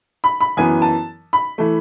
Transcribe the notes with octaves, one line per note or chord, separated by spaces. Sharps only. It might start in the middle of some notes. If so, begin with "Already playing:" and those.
B5
B5
F#2 E3 B3 G#5
A5
B5
E3 A3